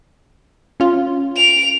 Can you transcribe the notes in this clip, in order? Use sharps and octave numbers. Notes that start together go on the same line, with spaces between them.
C#4 F4
D7 F7